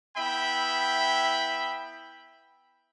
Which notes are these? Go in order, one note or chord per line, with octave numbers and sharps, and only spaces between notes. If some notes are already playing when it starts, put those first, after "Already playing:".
B3 E4 E5 G5 B5